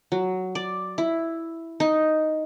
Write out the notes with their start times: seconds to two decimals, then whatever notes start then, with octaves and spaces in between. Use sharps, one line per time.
0.12 F#3
0.55 D5
0.98 E4
1.80 D#4